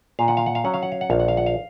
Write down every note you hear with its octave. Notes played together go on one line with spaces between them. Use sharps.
A#2 F5
F#5
F5
F#5
F5
F#3 C#4 F#5
F5
F#5
F5
F#5
A#1 F5
F#5
F5
F#5
F5